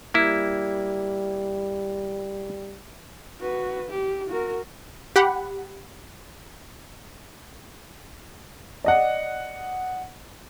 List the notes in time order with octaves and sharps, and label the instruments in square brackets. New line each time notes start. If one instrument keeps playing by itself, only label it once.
[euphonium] G3 [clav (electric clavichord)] A#3 E4
[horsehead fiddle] F#4 B4
G4
F#4 A#4
[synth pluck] G4 F#5 B5
[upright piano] D5 D#5 F#5